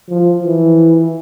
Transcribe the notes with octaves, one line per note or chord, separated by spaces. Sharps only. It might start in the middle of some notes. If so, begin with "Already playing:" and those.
F3
E3